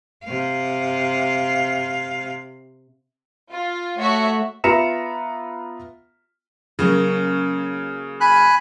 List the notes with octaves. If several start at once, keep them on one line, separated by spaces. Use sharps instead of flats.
C3 F5
F4
A3 F#4 C#5 E5
B3 F4 E5 A#5 C#7 E7
C#3 F#3 A#3 C#4
G#5 B5 F#6